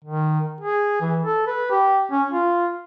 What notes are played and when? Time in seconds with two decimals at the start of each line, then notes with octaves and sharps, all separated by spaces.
0.04 D#3
0.61 G#4
1.01 E3
1.23 A4
1.47 B4
1.71 G4
2.12 C#4
2.31 F4